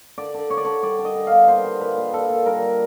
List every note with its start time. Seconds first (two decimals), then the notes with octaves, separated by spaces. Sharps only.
0.18 D3 D5
0.35 D3
0.50 D3 C#5
0.57 D5
0.65 D3 C#5
0.83 G3 D5
0.99 D3
1.05 D#5
1.16 D3
1.27 F5
1.32 B3
1.48 A#2 C5
1.64 G3
1.80 A#2 B4
1.97 A#2
2.13 A#2 A4
2.30 A#2
2.46 G3 A#4
2.62 G3